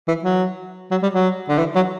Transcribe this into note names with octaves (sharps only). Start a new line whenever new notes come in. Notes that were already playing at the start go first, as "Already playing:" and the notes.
E3
F#3
F#3
G3
F#3
D3
E3
F#3